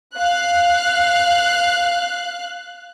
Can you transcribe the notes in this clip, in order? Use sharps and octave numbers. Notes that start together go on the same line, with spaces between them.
F5 F#6